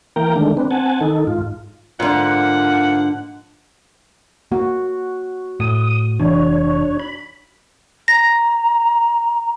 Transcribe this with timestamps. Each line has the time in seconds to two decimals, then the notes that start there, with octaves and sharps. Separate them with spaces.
0.16 E3 A#3 A#4 G5 A#5
0.36 D3 D#3 G#3 A3 D4
0.57 C4 D4 B4
0.71 C4 F#5 G#5 A5
1.01 D#3 D#4 A4
1.27 G#2 F4
2.00 G#2 D3 F3 A#3 F#5
4.52 A#3 F#4
5.60 A2 D#6
6.19 F1 E3 D4 C#5
6.99 B5
8.08 A#5 A#6